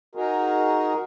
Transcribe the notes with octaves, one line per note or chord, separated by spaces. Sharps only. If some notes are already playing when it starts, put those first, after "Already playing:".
D#4 F#4 G#4 A#4